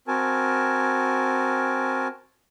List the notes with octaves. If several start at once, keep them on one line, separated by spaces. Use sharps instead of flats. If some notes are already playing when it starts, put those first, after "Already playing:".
C4 F#4 A#4 G#5 A5